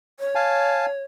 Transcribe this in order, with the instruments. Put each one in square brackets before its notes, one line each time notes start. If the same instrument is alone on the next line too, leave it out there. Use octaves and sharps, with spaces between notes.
[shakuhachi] C#5
[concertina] F5 G#5 A5